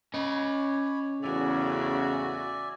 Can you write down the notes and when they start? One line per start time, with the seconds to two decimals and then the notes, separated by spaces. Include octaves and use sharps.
0.14 C#4 C#5 D#5 B5
1.23 E2 A2 C#3 F#4 D5 E5 G#5